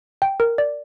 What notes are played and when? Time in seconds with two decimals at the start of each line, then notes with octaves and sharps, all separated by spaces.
0.22 G5
0.40 A#4
0.58 D5